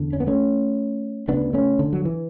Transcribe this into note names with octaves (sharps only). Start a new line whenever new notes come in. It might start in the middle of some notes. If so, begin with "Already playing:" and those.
Already playing: E2 D3
C#4
B3
A3 C#4
D2 C#3 B3 D4
A3 C#4
D3
F#3
E3